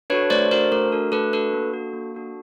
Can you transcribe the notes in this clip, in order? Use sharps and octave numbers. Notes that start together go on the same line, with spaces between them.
D4 F#4 A4 B4 C#5
A3 C5 D5
D4 F#4 A4 A#4 C5
A3 A#4
D4 F#4 A4
A3 A4 B4
D4 F#4 A4 B4
A#3
D4 F#4 A4
A#3
D4 F#4 A4